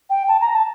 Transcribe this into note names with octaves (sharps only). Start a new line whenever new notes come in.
G5
A5
A#5
A5